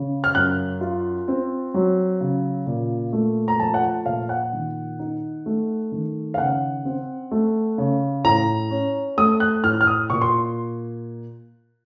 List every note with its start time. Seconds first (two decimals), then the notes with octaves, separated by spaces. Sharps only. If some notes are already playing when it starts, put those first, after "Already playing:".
Already playing: C#3
0.24 F6
0.34 F#2 F#6
0.81 F4
1.28 C4
1.74 F#3
2.21 C#3
2.67 A#2
3.13 A3
3.48 A#5
3.59 F3 A5
3.74 F#5
3.83 A5
4.06 A#2 F5
4.29 F#5
4.53 D#3
4.99 D#4
5.46 A3
5.92 D#3
6.34 F5
6.38 C#3 F#5
6.85 C4
7.31 A3
7.78 C#3
8.24 A2 A#5
8.70 C#4
9.17 A3 D#6
9.40 F#6
9.64 A2 F6
9.81 F6
9.87 D#6
10.10 A#2 C#6
10.22 C6